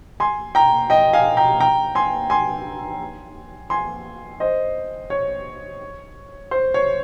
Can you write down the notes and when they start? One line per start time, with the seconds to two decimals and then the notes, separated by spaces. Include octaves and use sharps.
0.20 G#5 C6
0.55 G5 A#5
0.90 D#5 G5
1.13 F5 G#5
1.37 G5 A#5
1.60 G5 A#5
1.95 G#5 C6
2.30 G#5 C6
3.70 G#5 C6
4.40 C5 D#5
5.10 C#5
6.51 C5
6.74 C#5